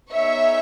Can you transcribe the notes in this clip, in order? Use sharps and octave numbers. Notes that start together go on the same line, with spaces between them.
B3 D#4 G#4 C#5 E5